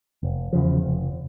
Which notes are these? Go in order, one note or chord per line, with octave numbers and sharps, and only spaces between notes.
F1
E2 C#3 F3
F1